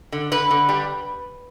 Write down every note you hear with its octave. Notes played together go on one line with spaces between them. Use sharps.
D3
D3 B4
D3
G3